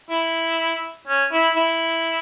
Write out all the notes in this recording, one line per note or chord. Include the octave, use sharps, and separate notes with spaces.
E4
C#4
E4
E4